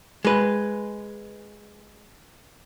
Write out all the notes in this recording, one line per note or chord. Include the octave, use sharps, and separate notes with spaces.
G#3 B4